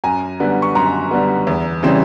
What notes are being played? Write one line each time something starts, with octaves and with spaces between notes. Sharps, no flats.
F#2 G#5 A#5
D3 G3 B3
C#6
F#2 A#5 C6
D3 G3 B3
E2
C#3 E3 G3 C4